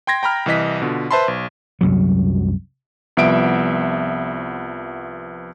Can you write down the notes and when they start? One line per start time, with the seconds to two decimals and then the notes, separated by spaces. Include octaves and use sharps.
0.07 G5 C6 G#6 A#6
0.23 G5 A#5 B5 F6
0.46 C2 E3 D#5 B6
0.82 B2 D3 F4
1.11 B4 C5 E5 A5 B5 C6
1.28 B1
1.81 C2 F#2 F#3
3.17 C2 F3 B3 E5 D7